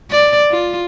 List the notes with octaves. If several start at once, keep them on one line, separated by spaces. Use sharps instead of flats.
D5
F4